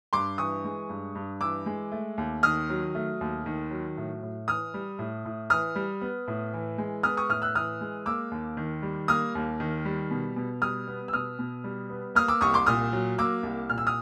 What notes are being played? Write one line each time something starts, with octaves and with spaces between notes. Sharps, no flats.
G2 C6 D6
E3 C#6 D#6
G#3
G2
G2
E3 D6 E6
G#3
A3
D#2
D#3 D#6 F6
F#3
A3
D#2
D#3
F#3
A2
A2
E3 D#6 F6
G3
A2
A2
E3 D#6 F6
G3
B3
A2
E3
G#3
B3 D#6 F6
C#6 D#6
A2 D#6 F6
E6 F#6
E3 D#6 F6
G#3
A#3 D6 E6
D#2
D#3
G3
A#3 D#6 F6
D#2
D#3
G3
B2
B2
G3 D#6 F6
B3
E6
B2 D#6 F6
B2
G3
B3
A#3 D#6 F6
D6 E6
C2 C#6 D#6
C6 D6
A#2 D#6 F6
F#3
A#3 D6 E6
C2
A#2 F6
E6
D#6 F6